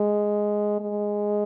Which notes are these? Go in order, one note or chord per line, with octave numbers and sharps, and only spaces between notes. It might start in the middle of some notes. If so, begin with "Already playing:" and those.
Already playing: G#3
G#3